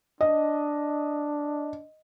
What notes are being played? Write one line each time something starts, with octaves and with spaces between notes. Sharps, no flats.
D4 D#5